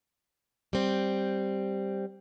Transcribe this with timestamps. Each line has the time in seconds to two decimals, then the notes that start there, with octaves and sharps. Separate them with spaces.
0.73 G3 C4